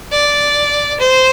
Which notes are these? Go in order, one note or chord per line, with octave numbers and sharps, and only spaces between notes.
D5
C5